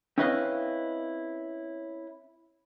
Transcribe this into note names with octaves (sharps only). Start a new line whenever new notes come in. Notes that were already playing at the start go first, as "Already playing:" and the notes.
C4 C#4 E4 B4 D#5 F5